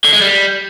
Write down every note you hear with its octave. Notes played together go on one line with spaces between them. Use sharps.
D3
G#3
G3